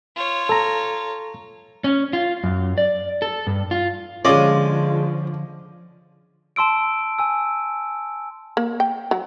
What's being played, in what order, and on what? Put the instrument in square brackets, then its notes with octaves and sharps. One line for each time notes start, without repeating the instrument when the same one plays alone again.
[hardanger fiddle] F4 C#5
[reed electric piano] A4 A#5
[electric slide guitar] C#4
F4
F#2
D5
A4
G2
F4
[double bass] D3 F3 [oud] G#3 F4 [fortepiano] C#4 [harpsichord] D5 D#5
[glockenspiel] A5 C6 E6 D7
G#5 E6
[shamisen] A#3
G5
F#3